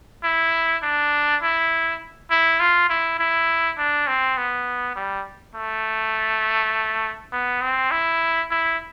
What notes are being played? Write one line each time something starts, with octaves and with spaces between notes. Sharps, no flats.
E4
D4
E4
E4
F4
E4
E4
D4
C4
B3
G3
A3
B3
C4
E4
E4